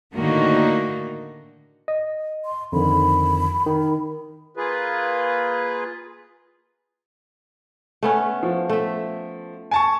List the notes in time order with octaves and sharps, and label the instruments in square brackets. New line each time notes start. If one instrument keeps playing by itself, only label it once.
[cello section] A2 D3 D#3 A#3 D#4 F#4
[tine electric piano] D#5
[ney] C6
[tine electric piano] F2 D3 D#3 [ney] B5
[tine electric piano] D#3
[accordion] A#3 F4 G#4 B4
[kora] A3 B3 C#4
[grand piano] F3
[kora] A3 E5
[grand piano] G#5 A5 C#6